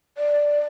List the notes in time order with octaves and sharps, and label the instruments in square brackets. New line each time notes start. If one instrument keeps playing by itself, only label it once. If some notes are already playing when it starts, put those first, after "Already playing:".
[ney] D5